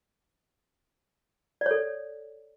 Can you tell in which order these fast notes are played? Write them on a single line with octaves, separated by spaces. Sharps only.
D5 C#5 A4